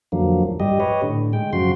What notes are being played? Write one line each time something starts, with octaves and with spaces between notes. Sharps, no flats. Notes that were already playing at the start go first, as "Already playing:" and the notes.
F2 D3 F3 F#3 A#3
G2 G3 G4 D#5
G4 B4 C#5 D#5
A2 D3
G#3 G5
F#2 C#3 F3 F#4 C6